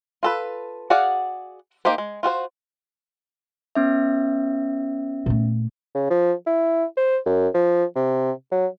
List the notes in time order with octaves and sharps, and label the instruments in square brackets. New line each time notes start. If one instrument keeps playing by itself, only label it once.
[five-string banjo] F4 A4 B4
F#4 G#4 D5 F5 F#5
A#3 D#4 G4 C5
G#3
F4 F#4 A4 C5
[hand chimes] B3 C#4 E5
[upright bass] A#2 A3
[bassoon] C#3
F3
E4
C5
F#2
F3
C3
F#3